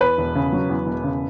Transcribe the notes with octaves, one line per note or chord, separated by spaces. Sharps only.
E2 B4
E1
C#3
F#3
E2
E1
C#3